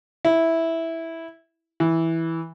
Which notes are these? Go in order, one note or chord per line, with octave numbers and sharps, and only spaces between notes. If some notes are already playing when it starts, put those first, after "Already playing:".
E4
E3